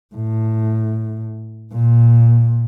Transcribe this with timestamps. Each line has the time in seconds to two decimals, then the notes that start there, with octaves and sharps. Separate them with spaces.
0.15 A2
1.73 A#2